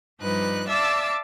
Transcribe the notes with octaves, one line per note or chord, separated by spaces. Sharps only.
G2 F3 G3 D#4 B4 F#6
D5 E5 F5 A5 D6 E6